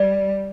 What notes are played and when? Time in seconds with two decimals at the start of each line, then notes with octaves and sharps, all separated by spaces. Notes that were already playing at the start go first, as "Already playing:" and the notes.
Already playing: G3 D5